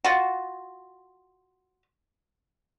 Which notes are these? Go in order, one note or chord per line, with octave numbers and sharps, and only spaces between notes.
F4 F#4